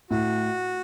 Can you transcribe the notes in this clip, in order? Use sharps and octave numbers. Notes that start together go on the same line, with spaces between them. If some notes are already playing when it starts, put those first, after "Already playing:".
A2 F#4